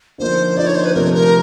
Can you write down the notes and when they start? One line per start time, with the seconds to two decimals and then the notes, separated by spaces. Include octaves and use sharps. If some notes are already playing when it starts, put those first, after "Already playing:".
0.18 D3 F3 A#3 D#4 C5
0.57 D3 F3 A#3 D#4 D5
0.67 C#5
0.75 C5
0.85 B4
0.94 C3 F3 A3 A#4
1.14 A#4